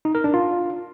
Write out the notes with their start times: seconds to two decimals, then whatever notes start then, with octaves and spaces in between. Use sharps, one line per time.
0.05 D#4
0.15 A#4
0.24 D4
0.34 F4